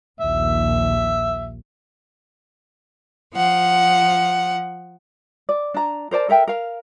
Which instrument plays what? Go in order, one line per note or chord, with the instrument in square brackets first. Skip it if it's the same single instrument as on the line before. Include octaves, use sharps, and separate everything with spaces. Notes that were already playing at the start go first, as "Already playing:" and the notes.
[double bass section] A#1 D#2 [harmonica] E5
[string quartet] F3 F#5
[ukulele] D5
D4 A#5
A#4 C5 D5 A5
A4 A#4 E5 G5
A#4 F5